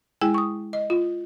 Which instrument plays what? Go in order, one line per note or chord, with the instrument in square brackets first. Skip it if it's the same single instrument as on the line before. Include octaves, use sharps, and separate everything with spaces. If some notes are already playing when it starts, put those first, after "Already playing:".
[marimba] G#3 E4 G#4 [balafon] G5
[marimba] C#6 D#6
[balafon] D#5
F4